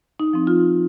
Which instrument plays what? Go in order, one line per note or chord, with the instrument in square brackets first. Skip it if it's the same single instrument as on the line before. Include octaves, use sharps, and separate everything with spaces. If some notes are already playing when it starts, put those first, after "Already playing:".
[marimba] D#4
F3 C4
F4